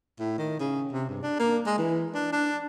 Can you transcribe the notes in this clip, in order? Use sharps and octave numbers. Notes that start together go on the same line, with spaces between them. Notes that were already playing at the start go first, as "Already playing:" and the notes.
A2
D#3
C#3
C3
G2
D4
A#3
G#3
E3
D4
D4